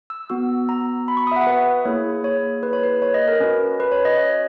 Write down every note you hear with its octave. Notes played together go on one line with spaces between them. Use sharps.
E6
B3 F#4 E6
A#5
B5
C#6
D#6
E5
F#5
B4
A#3 E4 G#4 C#5
C#5
B4
C#5
B4
C#5
D#5
A#4
C#4 F#4 B4
B4
C#5
D#5
C#5